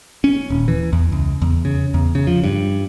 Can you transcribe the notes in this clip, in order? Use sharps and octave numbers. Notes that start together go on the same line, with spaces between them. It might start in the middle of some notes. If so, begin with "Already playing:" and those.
C#4
D#1
E3
E2
C#2
E2
C#3
E2
C#3
F3
G2